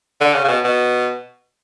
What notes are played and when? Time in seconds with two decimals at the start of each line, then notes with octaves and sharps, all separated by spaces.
0.21 D3
0.33 C#3
0.44 C#3
0.48 B2
0.64 B2